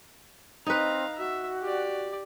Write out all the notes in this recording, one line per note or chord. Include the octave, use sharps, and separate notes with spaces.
C4 D#4 B4 F5 A#5
F#4 E5
G4 D5